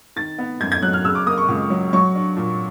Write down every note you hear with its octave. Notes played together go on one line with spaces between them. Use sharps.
D#3 A6
B3
F#2 G#6
G#6
F#3 F#6
F6
C#3 E6
D6
A#3 D#6
C#6
C#2
F#3
F#3 C#6
D4
A#2